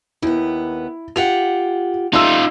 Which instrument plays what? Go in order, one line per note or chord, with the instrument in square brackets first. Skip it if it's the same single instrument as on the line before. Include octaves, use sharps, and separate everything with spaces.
[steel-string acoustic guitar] D#2 B3 [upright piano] E4
[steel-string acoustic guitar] F4 G4 F#5 [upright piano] F7
[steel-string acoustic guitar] G3 A3 A4 [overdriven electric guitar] D#4 F4 [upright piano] C6 E6